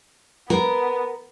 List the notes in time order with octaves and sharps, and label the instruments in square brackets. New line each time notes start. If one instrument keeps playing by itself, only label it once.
[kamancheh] B3 [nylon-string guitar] A#4